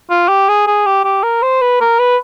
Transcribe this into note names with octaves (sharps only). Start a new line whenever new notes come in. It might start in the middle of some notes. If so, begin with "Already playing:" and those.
F4
G4
G#4
G#4
G4
G4
A#4
C5
B4
A#4
B4